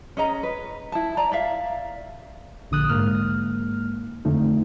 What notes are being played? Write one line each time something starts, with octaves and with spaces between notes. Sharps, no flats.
C#4 G#4 D#5 A#5
B4
E4 A5
D5 A#5
D5 E5 F5
A#1 D3 D#6 F#6
G#2 A#3 F6
F2 D3 F3 A3 D#4